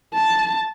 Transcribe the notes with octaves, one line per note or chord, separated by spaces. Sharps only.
A5